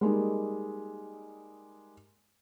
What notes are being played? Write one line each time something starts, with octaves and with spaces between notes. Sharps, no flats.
G3 G#3 A#3 D#4